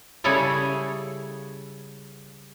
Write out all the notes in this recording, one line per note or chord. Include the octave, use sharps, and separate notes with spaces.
C#3 G3 E4 G#4 A4 C#5